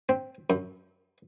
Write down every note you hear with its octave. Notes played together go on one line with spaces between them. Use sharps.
C4
F#2